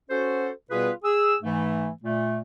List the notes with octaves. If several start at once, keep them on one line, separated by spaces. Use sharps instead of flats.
C#4 F#4 A4 C5
B2 G3 B3 F4 G#4 B4
G#4 E6
G#2 E3 A3
A#2 A3